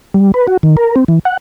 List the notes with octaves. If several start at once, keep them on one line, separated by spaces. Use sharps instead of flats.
G3
B4
F#4
D#3
A#4
C4
E3
F#5